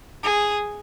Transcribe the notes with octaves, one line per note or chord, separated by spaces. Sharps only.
G#4